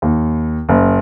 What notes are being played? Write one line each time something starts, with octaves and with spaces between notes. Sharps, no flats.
D#2
F#1